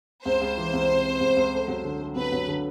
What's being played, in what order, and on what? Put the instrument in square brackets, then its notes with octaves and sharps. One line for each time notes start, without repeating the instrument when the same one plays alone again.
[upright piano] C#2 [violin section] C5
[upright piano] C#2
E3
C#2
C3
C3
C#2
C#2
A3
F#3
D3
A3
[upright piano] F#3 [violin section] B4
[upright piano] F#3
D3